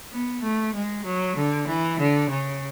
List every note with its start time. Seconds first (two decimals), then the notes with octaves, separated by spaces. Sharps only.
0.11 B3
0.42 A3
0.74 G#3
1.05 F#3
1.36 D3
1.67 E3
1.99 D3
2.30 C#3